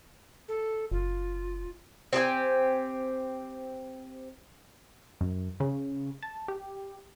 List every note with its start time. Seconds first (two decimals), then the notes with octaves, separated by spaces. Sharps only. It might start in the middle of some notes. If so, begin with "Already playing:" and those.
0.48 A4
0.92 F#1 F4
2.13 C4 G4 G#4 G#5
5.21 F#2
5.60 C#3
6.23 A5
6.48 G4